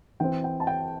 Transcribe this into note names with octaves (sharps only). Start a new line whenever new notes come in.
E3 C4 G5
G5
A5
G5